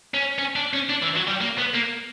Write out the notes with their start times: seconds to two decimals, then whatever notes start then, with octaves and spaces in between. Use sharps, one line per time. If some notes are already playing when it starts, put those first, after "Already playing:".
0.14 C#4
0.38 C#4
0.56 D4
0.73 C#4
0.89 D4
1.02 E3
1.16 F#3
1.28 G3
1.41 A#3
1.58 B3
1.74 A#3